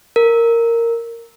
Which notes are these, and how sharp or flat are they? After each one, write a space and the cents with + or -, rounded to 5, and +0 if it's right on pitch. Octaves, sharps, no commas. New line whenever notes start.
A#4 -10